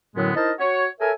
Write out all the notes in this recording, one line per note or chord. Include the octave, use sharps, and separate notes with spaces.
F#2 A2 D3 F#3 G#3 B3
D#4 E4 A#4 C5 D#5 A5
F#4 C#5
A4 A#4 C#5 E5 G#5